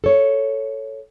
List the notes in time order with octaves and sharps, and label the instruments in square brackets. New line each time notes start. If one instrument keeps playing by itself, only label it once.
[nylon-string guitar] A4 C#5